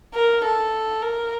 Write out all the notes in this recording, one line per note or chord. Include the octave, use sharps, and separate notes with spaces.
A#4
A4
A#4